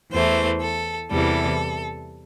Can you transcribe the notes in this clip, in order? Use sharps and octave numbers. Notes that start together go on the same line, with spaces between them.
E2 E3 A3 C5
A4
E2 C3 E3 G3 A4